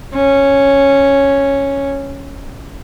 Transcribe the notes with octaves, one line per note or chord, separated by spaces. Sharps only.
C#4